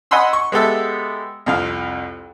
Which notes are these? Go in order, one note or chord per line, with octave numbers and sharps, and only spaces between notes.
D#5 F#5 G#5 B5 C6 E6
C#6
G#3 B3 G4 A4 E5
C2 F2 F5